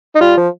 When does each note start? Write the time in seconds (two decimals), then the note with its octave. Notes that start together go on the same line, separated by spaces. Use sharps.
0.15 D#4
0.21 G3 F4
0.37 F3